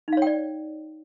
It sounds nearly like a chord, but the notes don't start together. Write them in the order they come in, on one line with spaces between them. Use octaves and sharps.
D#4 F5 C#5 G5 D5